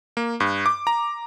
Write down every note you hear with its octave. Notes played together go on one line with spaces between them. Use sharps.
A#3
G2
D6
A#5